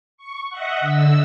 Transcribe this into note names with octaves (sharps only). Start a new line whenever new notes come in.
C#6
D#5 E5 F#5
D3 E6